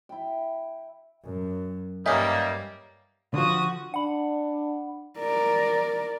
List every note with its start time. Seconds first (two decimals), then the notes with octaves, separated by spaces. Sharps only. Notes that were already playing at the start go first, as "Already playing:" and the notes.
0.09 E4 G5
1.24 F#2
2.06 G2 G3 A#3 C#4 D#4 A#4 E5 G#5
3.34 D3 F3 F#4 D#6
3.94 D4 F#5 B5
5.19 A#4 D5